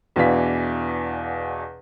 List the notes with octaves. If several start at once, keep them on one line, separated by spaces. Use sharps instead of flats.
E2 B2 E3 D4 F5 B6